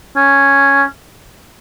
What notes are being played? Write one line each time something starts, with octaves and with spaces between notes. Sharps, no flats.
C#4